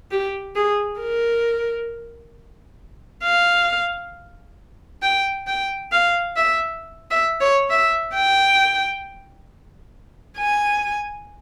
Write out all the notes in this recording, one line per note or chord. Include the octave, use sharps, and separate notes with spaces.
G4
G#4
A#4
F5
G5
G5
F5
E5
E5
C#5
E5
G5
G#5